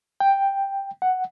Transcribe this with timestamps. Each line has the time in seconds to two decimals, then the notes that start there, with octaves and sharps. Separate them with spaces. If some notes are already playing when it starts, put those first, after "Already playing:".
0.20 G5
1.02 F#5